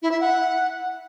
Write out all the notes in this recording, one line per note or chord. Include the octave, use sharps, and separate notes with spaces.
E4
E5
F#5